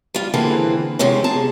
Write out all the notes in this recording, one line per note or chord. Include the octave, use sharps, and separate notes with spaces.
G3 F4
D3 E3 A#3 C4 G#4 B4
E2 C3 G#3 C#4
G#4 A5 A#5